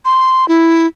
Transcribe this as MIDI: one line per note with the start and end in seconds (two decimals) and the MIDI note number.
0.05 0.48 84
0.48 0.87 64